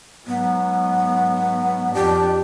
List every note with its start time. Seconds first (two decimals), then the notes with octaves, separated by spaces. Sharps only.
0.27 G#2 F#3 B3
1.94 F2 D4 G4